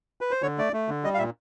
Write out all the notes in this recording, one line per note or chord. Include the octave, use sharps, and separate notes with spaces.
B4
C5
D3 C#5
A3 D5
A3
D3
G3 D#5
F5
A#2 E5